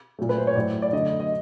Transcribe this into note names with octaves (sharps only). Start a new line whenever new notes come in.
A#2 F#3 A3
B4
C5
C#5
A2 F#3 A3 D5
D5
F#2 D3 F#3 A3 D#5
D#5